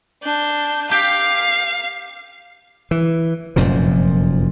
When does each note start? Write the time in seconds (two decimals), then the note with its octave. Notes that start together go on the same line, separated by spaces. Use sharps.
0.23 D4 G6
0.91 G4 F5 G5
2.91 E3
3.56 F1 F#2 A#2 F3